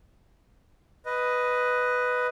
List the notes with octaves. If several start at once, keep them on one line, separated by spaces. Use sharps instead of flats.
B4 D#5